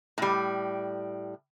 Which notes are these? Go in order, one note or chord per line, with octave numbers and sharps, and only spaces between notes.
A2 G3